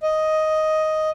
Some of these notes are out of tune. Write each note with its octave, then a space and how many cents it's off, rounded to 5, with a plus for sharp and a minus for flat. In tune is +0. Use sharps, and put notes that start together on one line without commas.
D#5 +5